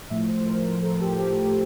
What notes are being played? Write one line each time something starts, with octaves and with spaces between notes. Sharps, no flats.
A2 F3 A3 E5
C5
A#4
A4
G4
G4
G4